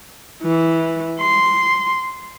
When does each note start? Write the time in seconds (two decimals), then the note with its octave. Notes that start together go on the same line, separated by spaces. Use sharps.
0.43 E3
1.20 C6